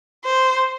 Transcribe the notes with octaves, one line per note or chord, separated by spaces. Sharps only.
C5